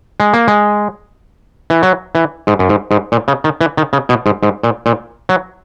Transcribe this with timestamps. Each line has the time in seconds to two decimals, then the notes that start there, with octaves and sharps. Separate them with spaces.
0.20 G#3
0.33 A#3
0.48 G#3
1.70 E3
1.83 F#3
2.15 E3
2.47 G#2
2.59 F#2
2.69 G#2
2.91 G#2
3.12 A#2
3.28 C#3
3.44 D#3
3.61 E3
3.77 D#3
3.93 C#3
4.09 B2
4.26 G#2
4.43 G#2
4.64 A#2
4.86 A#2
5.29 F#3